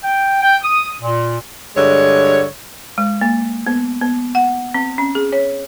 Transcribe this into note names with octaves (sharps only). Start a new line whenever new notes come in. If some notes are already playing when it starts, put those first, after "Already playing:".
G5
G5
D#6
A#2
G2 D3 G#3 C#5
G#3
A#3
B3
B3
F#5
C4
C#4
G#4
C#5